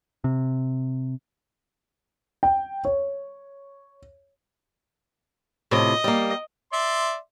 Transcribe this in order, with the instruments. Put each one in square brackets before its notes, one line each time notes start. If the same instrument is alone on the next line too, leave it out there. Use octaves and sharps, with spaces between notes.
[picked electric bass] C3
[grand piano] G5
C#5
[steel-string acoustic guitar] A2 C3 F3 [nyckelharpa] D#5
[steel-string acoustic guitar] G3 A#3
[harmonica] D5 E5 C6